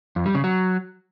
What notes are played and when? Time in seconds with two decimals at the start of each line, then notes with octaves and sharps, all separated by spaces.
0.16 F2
0.25 G3
0.35 C#3
0.44 F#3